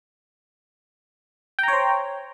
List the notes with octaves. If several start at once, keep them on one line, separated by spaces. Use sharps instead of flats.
C5 C#5 G5 A#5